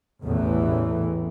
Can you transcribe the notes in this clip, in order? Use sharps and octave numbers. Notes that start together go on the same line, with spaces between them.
A1 E2 A2 E3